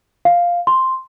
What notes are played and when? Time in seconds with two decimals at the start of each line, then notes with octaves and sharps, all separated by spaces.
0.25 F5
0.67 C6